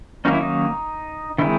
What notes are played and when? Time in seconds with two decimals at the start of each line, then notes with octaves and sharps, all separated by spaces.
0.25 D#3 F#3 A#3 C#4 D#4
0.33 E4
0.40 D#4
1.38 D#3 G#3 C4 E4